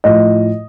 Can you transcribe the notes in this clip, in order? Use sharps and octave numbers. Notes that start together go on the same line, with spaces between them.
A2 F3 D#5